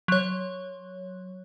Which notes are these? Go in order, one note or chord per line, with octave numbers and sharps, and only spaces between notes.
F#3 C#5